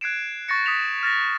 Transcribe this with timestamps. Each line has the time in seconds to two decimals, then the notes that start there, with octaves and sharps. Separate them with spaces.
0.01 F#6 G#6 C7 D7 E7
0.49 C#6 A6 A#6 C#7
0.66 D#6 A6 B6 C#7 E7 F7
1.03 F6 A6 A#6